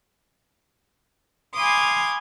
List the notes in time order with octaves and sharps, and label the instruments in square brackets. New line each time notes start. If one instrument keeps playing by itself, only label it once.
[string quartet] F5 G#5 B5 C6 D6 D#6